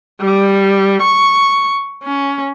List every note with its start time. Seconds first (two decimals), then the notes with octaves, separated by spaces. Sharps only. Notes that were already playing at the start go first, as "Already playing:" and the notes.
0.21 G3
1.01 C#6
2.04 C#4